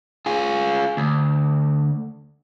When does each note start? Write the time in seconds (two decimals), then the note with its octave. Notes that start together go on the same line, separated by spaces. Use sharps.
0.26 F4 G#4
0.97 D2